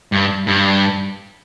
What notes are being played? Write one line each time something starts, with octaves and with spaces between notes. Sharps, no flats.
G2
G2